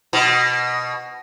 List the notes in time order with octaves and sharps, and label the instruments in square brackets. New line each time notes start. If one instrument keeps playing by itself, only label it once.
[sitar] B2